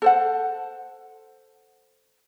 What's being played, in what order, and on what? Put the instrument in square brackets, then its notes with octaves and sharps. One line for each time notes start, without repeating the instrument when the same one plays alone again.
[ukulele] A4 C5 F#5